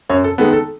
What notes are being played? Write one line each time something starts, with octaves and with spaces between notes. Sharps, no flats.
F#2 C#5
A4
D#3 G#3 B3 A4
A4